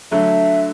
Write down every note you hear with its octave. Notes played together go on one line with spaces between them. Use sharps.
D3 F#3 A3 E5